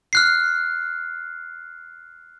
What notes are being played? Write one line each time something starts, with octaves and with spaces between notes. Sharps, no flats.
F6 F#6 C7